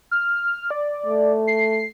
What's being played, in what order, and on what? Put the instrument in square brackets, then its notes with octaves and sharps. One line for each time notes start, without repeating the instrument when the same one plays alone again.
[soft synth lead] F6
D5
[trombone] A3
[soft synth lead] C7